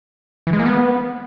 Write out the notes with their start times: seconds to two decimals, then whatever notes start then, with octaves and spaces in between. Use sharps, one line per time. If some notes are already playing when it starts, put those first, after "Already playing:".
0.47 E3
0.53 G#3
0.59 A#3
0.66 B3